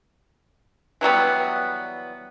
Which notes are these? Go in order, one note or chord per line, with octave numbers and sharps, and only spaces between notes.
E3 F#3 G3 B3